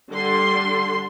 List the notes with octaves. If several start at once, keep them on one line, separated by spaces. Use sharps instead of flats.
D3 G3 C6